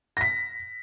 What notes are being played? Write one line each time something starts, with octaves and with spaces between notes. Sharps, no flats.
A#6 B6